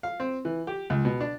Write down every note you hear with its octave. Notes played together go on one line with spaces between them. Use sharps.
F5
C4
E3
G4
C#2
B2
D4